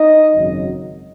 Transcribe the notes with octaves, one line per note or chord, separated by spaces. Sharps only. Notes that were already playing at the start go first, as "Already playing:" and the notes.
Already playing: D#4 D#5
G#1 F#2 C#3 F#3